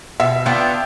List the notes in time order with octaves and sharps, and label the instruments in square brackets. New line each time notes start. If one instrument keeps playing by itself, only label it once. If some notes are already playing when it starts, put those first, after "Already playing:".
[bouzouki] B2 [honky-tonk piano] E5
[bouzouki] B3 D4 F4 [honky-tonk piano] G5